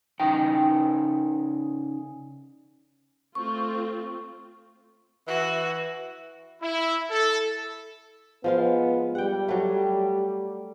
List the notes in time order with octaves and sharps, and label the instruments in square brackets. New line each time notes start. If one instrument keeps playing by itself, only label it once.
[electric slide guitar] C#3 D#4 G5
[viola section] A3 C4 F4 [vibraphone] C#6
[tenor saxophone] E3 [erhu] F#4
[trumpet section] E4
A4
[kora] F3 G#3 F4 [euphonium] B3
[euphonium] G3 [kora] F#5 G5
[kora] F#3 A3